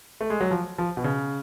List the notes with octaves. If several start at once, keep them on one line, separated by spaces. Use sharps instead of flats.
A3
G#3
F#3
F3
F3
B2
C#3